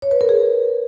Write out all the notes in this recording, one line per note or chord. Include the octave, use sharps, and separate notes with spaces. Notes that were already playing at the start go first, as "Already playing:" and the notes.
C#5
B4
A#4
G#4